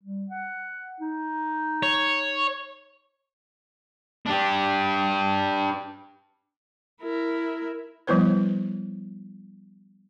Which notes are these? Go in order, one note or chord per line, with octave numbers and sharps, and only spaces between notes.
G3
F#5
D#4
C#5
D4 G4
E4 A#4
F3 G3 B3 E4 B4 C5